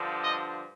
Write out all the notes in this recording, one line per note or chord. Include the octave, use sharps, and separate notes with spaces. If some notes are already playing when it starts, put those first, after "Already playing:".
Already playing: G2 D3 F3
D#5